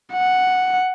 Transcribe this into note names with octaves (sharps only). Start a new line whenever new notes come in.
F#5